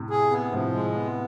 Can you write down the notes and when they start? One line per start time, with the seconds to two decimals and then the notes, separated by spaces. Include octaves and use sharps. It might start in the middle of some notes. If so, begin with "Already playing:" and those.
Already playing: A2 C3
0.10 G#4
0.30 B3
0.52 A2 C3 F3
0.73 G#3
0.94 B3